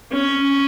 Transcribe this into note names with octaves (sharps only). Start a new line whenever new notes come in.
C#4